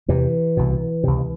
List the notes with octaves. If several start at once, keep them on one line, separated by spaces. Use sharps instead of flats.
E2 C3 E3
C2 B2
C#2 C3